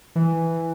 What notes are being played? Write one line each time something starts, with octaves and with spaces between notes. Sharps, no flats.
E3